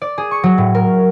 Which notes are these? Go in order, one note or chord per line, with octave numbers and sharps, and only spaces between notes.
D5
G#4
C#6
F#3
A2
A#4